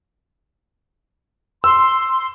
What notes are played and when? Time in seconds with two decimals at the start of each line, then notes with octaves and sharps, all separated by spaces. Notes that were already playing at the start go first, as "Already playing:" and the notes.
1.64 C6 E6